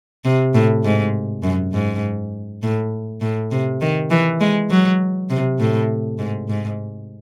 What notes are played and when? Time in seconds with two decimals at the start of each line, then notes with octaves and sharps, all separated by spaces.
0.25 C3
0.54 A2
0.84 G#2
1.43 F#2
1.73 G#2
2.63 A2
3.21 A2
3.51 C3
3.81 D#3
4.11 E3
4.41 G#3
4.70 F#3
5.30 C3
5.60 A2
6.19 G#2
6.49 G#2